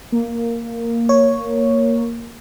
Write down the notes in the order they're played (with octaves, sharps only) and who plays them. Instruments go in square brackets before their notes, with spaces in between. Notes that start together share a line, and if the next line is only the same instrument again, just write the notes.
[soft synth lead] A#3
[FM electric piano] C#5